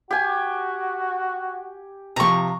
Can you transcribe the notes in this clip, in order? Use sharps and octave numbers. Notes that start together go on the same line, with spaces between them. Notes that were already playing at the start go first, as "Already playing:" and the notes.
F#4 G4 G#5
C3 F3 A#5 C#6